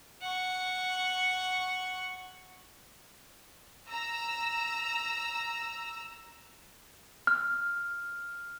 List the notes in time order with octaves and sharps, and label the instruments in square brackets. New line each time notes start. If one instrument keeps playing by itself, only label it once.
[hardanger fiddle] F#5 C#6
[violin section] A#5 E6
[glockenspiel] F6